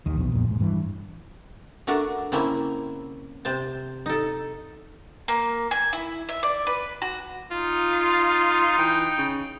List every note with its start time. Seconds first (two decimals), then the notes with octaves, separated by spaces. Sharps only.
0.06 D#2 D#3
0.18 A#1 E2 B2
0.32 A1 F2 A#2
0.48 G#2
0.60 G2 E3
1.87 A3 D4 F#4 A#4
2.32 C#3 A#3 C4 C#4 E4 E5
3.45 C3 C5 A5
4.06 D#4 A4
5.28 A#3
5.71 G#5
5.93 E4
6.29 E5
6.43 D5
6.67 B4
7.02 F#4
7.51 D#4 F4
7.94 C6
8.78 E3 G5
9.18 C#3